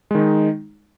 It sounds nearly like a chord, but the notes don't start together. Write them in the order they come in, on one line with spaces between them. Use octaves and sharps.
G#3 D#3 D#4